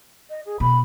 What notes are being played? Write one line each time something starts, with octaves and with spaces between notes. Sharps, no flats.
D#5
G#4
B2 B5